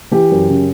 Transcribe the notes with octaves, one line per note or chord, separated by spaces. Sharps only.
E3 G4
F#2
C#3